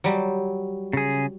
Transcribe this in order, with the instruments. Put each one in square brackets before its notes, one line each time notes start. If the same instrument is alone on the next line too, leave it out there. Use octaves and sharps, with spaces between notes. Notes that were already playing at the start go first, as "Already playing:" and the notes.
[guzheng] F#3 G3
[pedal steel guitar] C#3 G#4